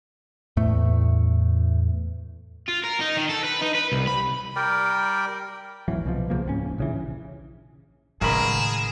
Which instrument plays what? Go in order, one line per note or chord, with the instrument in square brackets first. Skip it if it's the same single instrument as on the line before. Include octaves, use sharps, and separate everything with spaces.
[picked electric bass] E2 A2 A3
[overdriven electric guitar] F4
A#4
D#4
D#3
A4
B4
D#4
B4
C2
B5
[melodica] G3 A#4 D5 G5
[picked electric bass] D1 G#1 E3 F#3
C2 B2 F3
C#3 E3 F3 A#3
D1 G#2 B3 C#4
D#1
A#1 C#3 E3
[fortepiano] G#1 A#4 B5 [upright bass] A2 C#3 [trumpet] G#4 [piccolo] E7